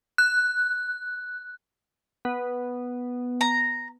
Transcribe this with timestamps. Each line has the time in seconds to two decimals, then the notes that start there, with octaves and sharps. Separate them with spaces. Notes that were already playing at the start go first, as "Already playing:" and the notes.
0.18 F#6
2.25 B3
3.41 A#5